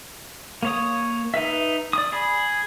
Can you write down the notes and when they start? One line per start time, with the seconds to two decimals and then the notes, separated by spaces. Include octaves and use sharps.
0.63 A#3 C#5 D#6
1.34 D#4 B4 E5
1.93 D5 D#6
2.12 G#4 B5